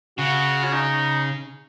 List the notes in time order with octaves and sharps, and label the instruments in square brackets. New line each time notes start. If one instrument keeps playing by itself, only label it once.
[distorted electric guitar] C#3 [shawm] F#4
[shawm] C#4
D#4